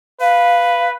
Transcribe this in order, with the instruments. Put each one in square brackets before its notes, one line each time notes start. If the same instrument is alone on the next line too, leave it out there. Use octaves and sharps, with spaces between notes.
[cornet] B4 [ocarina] F5